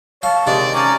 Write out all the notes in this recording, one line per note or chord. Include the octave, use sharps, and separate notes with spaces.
C#5 F5 A5
C3 D#3 G#3 D5
C#4 D5 A#5